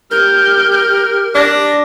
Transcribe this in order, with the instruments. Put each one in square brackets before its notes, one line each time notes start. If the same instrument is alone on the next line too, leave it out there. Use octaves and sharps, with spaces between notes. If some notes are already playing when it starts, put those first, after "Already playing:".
[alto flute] G4 [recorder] A#4 [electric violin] F6 G6
[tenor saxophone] D4 [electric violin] A#6